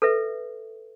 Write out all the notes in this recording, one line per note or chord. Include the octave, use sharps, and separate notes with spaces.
A4 B4 E5